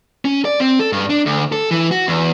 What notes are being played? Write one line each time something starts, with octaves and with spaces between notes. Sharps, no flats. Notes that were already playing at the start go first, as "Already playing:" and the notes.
C#4
D5
C4
A4
G2
D4
D2
A4
E3
F#4
E2